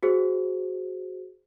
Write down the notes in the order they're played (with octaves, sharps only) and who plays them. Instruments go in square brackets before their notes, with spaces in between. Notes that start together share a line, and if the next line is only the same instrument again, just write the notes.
[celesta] F#4 G#4 C5